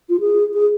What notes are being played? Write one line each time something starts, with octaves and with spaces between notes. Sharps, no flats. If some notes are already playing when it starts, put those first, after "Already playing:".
F4
G#4
G#4